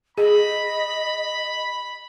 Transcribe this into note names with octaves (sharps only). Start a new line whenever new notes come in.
G#4 D#5 B5